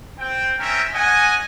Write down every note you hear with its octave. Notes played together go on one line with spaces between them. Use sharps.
C4 G5
C4 C#4 A#4 E5 G5
C#4 D#5 F#5 G#5